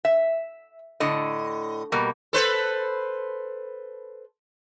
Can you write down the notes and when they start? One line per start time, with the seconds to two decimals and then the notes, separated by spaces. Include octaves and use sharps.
0.05 E5
1.00 A2 D3 D#5
1.92 B2 G3 A#3
2.33 A4 B4 C5